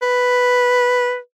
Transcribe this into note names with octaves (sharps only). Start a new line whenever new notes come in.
B4